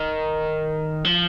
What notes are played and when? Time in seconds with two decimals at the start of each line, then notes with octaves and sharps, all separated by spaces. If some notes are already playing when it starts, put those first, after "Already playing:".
Already playing: D#3
1.05 F3